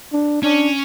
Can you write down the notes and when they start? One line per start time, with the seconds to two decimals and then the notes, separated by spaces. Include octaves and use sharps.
0.13 D4
0.43 C#4 D4